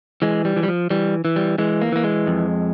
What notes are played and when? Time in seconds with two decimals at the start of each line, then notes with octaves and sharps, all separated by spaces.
0.22 E3 G#3
0.45 G3
0.56 E3
0.63 G3
0.68 F3
0.90 E3 G3
1.25 E3
1.36 G3
1.58 E3 G#3
1.81 A#3
1.92 E3 A#3
2.04 G#3
2.27 F2